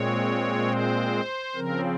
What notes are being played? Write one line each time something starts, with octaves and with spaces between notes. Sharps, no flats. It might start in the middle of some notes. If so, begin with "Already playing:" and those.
Already playing: A#2 G#3 C4 C#5
C5
C#3 F3 C4 A#4